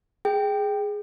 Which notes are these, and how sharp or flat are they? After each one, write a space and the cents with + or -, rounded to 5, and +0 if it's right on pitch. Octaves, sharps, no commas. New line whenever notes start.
G#4 +0 G5 +0